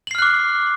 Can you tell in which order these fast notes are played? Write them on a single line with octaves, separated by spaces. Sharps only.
F#7 C7 F6 F#6 D6